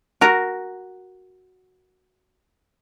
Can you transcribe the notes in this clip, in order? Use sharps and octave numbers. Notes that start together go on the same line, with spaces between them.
F#4 A#4 A#5